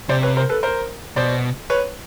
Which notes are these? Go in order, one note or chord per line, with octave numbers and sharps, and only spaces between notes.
C3 C5 D5
B4 C#5
A#4 C5
A4 B4
A#4 C5
B2 C5 D5
B4 C#5